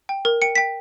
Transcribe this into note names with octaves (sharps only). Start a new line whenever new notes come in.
G5
A#4
G5 C#7
G5 B6